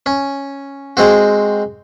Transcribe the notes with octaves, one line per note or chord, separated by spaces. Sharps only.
C#4
G#3 C4 F#4